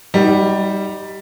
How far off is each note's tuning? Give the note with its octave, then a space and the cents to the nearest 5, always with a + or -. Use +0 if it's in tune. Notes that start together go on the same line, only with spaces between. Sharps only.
G3 +0 D#4 +15 F#4 +35